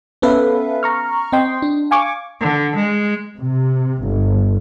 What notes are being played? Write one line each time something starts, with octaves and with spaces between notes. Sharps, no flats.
B3 C#4 A4 B4 E5 F5
A#5 C#6 F6
C4 D#5 G5 C6
D4
F5 G#5 C#6 D6
D3
G#3
C3
G1